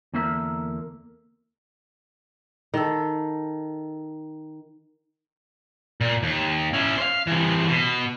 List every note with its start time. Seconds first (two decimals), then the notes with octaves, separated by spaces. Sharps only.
0.14 E2 D3 A#3 A#4 E5
2.74 D#3 A4
6.01 A#2
6.23 D#2
6.73 C#4 E4
6.98 C5 F5
7.27 C3 E3
7.68 B2